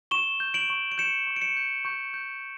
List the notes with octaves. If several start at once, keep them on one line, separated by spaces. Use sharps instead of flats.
C#6 E7 G7
G6
D7 F#7
C#6
D7
G6 C#7 E7
C#6
D7
C#7 E7
G6
C#6 G6
G6